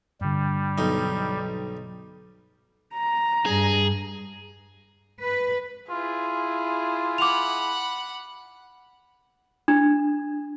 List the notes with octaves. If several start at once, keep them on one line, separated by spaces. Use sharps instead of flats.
G2 D3 G3
B1 D#4
A#5
G2 G#4
B4
E4 F4 G#4
F#5 B5 D6 F7
D4